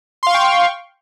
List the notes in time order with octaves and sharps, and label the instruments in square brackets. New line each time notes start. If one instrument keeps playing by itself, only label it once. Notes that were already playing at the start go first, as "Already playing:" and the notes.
[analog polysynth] C6
F5
C#6
G5